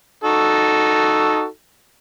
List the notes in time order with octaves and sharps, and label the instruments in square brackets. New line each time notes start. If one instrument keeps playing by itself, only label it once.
[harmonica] D#4 F#4 A4